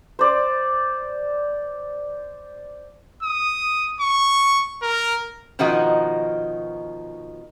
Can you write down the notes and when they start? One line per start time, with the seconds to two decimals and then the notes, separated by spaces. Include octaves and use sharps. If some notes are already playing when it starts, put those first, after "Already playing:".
0.19 C5 D5
3.23 D#6
4.01 C#6
4.83 A#4
5.59 B2 D#3 F3 D#4 F#4 D#5